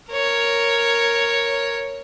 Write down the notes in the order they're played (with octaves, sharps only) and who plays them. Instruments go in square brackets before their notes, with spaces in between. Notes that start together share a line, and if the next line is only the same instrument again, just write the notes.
[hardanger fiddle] A#4 C#5